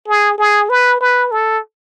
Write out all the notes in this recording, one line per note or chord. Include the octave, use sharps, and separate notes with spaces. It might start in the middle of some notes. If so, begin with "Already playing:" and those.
G#4
G#4
B4
B4
A4